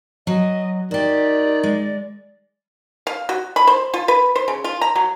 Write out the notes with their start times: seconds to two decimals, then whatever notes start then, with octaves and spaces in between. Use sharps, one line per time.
0.27 F#3 D#5
0.91 D#3 F#4 G4 D5
1.63 G#3
3.07 F5
3.29 F#4
3.56 B5
3.67 C5
3.94 F4
4.08 B4
4.36 C5
4.48 C#3
4.64 F4
4.81 A#5
4.96 F#3